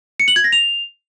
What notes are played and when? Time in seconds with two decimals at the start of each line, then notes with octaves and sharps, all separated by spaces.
0.20 C#7
0.28 F#7
0.36 G#6
0.44 A#6
0.52 F7